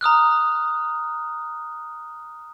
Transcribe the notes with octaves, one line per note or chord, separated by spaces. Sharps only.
A#5 D#6 F6 F#6